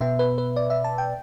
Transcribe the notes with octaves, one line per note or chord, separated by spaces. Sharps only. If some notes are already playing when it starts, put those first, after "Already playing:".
B2 B3 E5
B4
B4
D5
E5
A5
G5